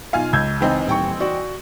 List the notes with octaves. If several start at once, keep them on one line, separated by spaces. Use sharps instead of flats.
B1 F4 F5 G#5
C#2 E6 G6 G#6
E3 C4 D#4
D#1 G5 C#6
F#4 D5